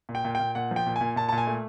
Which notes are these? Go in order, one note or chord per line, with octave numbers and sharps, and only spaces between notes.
A#2
G5
A#2
A#2 G5
A#2 F#5
F3
G5
A#2
G#5
A#2
A#2 A5
A#2 A5
G#5
A3